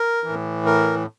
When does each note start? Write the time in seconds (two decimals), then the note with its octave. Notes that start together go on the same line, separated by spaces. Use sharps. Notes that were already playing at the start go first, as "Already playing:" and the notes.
Already playing: A#4
0.24 E3
0.29 A2
0.66 A#4